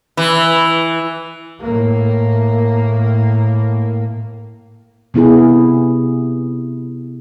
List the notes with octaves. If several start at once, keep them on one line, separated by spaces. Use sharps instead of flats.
E3
A2 A#3
C3 B3 E4 G#4